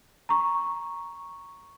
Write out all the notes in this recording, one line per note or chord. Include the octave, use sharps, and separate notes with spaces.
A#5 C#6